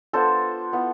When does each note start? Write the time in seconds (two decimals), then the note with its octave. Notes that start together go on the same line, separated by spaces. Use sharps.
0.13 B3 D4 F4 A4 C5
0.73 B3 E4